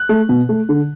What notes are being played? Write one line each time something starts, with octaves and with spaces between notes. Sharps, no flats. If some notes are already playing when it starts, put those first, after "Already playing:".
Already playing: F#6
A3
B2
A3
D3